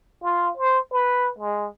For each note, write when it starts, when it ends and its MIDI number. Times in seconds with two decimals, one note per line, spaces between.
0.23 0.51 65
0.57 0.79 72
0.93 1.32 71
1.38 1.68 56